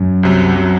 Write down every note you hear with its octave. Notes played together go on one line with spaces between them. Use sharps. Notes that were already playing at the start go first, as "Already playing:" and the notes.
Already playing: F#2
C2 C3 F#3
C3 F#3